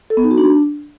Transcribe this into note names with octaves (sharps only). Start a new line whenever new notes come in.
A4
B3
D#4
F#4
D4